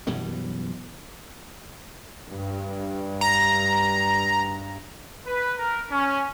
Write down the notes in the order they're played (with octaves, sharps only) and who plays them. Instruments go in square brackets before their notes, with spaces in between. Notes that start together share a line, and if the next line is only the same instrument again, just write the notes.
[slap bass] F#2 B2 E3 G3
[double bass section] G2
[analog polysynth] A#5
[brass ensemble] B4
A#4
C#4